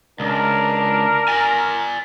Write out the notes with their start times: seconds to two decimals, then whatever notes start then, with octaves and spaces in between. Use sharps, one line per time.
0.20 C#2 D4 A#4
1.28 D5 G#5